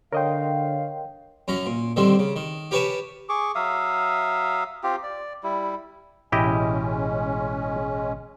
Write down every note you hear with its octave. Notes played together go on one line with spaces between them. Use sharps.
D3 A#4 C#5 D#5 F5 G5 C6
F#2 C#4 A#5
A#2
D3 D#3 G3 C4
C#3
D#3
G4 A#4 B4 C#5 G#5 A5
G#4 C#6 D6
F#3 E5 F5 D#6
C4 F4 G4
D5
G3 E4
A1 B2 G#3 C#4 E4 G4 D#5